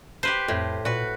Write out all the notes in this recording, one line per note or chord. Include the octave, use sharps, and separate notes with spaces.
G4 B4 C5
F2 A2
A#2 F#4 B4